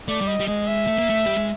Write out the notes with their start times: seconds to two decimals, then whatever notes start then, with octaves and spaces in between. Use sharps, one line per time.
0.08 A3 D5
0.21 G3
0.27 D#5
0.40 G3
0.47 G#3 D#5
0.68 E5
0.87 A3
0.98 A#3
1.10 A3
1.26 G3
1.37 G#3